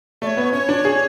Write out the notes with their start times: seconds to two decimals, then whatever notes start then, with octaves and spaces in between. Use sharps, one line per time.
0.22 A3 D5
0.27 C#5
0.37 B3
0.53 C#4 C#5
0.69 D4
0.85 G#4